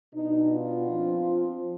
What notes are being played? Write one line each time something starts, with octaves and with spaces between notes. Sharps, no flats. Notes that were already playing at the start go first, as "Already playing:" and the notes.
B2 B3 D4 D#4
F4
F3 C4